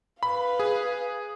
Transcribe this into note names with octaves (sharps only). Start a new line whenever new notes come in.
B4 F5 B5
G#4